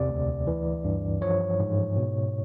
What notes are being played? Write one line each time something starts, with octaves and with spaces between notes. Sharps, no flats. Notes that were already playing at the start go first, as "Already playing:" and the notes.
Already playing: E2 C3 D5
D2
E3
G2
F3 C#5
G#2
B2